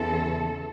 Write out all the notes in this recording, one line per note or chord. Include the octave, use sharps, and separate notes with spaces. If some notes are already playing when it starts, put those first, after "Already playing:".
Already playing: E2 C#3 E3 A4